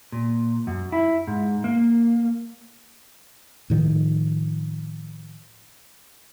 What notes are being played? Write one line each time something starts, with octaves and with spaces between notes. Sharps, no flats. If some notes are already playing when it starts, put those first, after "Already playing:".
A#2
F#2
E4
G#2
A#3
A2 D#3 F3